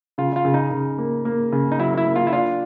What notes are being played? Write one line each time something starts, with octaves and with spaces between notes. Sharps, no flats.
C#3 F4
F4
C#3
D#4
C#3
A#3
A#3
C#3
D#4
F#3 E4
E4
A#3
F4
E4
D4 F4